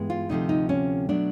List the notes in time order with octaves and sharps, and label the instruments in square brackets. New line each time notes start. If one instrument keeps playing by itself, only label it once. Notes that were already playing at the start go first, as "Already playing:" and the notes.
Already playing: [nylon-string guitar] G2 E3 G#3 B3
F4
D2 C3 F3 A3 D#4
D#4
C#4
B2 F#3 A3 D4